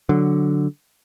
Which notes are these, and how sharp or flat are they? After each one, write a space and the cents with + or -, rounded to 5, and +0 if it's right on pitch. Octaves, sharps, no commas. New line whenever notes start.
D3 +0 F#3 +0